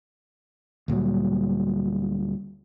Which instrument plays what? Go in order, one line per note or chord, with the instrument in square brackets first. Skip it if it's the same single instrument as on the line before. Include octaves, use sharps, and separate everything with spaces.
[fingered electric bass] D2 A#2 F#3 G3